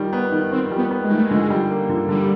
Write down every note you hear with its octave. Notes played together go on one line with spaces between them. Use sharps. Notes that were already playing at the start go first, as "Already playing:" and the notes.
Already playing: D#3 G3
B3
D#3
D#3 C4
G3
B3
B3
G#3
D#3 A3
G#3
D3
G3
A#3
D3
D3 G3